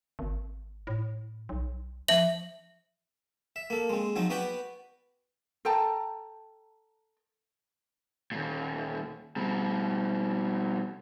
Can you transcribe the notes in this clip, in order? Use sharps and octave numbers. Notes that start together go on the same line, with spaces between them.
G#1
A2
B1
F3 E5 F#7
E5
A#3 A4
G#3 C4
F3 F#3 C4 D#4
B3 F#4 B4 D5 G5
A4 G5 A5 A#5
D#2 A#2
B2 G3